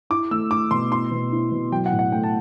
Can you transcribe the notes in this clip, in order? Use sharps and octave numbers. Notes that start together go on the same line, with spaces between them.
E4 D6
A3 E6
E4 D6
B2 C6
E4 C6
B2
E4
B2
F#3 G5
F#5
A2
F#5
A3 G5
A5